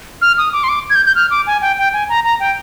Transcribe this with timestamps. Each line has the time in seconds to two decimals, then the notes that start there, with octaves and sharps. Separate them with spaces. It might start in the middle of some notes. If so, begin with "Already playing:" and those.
0.22 F6
0.38 D#6
0.53 D6
0.64 C6
0.69 D6
0.90 G#6
0.95 G6
1.06 G6
1.15 F6
1.31 D6
1.47 G#5
1.62 G5
1.78 G5
1.93 G#5
2.09 A#5
2.24 A#5
2.40 G5